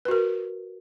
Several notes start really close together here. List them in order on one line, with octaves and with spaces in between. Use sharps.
B4 F#4 A#4